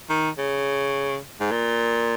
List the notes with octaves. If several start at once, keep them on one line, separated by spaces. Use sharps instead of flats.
D#3
C#3
G#2
A#2